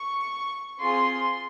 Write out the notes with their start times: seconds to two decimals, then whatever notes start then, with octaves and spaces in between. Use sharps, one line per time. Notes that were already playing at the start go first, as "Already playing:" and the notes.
Already playing: C#6
0.80 C4 F4 G#4 C6